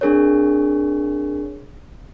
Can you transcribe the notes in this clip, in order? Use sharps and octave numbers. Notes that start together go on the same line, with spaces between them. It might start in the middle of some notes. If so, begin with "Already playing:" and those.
C4 D4 G#4 A#4 C#5